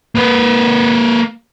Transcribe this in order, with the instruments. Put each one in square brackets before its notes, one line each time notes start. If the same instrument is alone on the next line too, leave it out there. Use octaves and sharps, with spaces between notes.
[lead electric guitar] A#3 B4